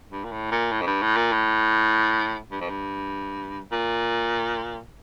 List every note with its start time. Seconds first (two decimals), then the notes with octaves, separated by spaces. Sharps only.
0.11 G2
0.25 A#2
0.32 A2
0.52 A#2
0.72 A2
0.81 F2
0.87 G2
1.02 A2
1.16 A#2
1.32 A2
2.52 G2
2.61 F2
2.69 G2
3.72 A#2